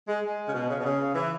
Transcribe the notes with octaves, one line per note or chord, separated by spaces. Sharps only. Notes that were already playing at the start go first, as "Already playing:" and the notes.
G#3
G#3
C#3
B2
C#3
B2
C#3
E3